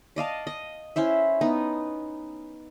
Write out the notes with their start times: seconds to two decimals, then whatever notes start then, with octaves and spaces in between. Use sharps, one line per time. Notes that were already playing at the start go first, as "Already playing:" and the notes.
0.16 D5 D#5 F5 A5
0.47 D#5
0.96 C#4 E4 C5 E5
1.41 B3 D#4